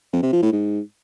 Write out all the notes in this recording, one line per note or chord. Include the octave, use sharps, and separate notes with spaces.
F2
C3
F3
A2
G#2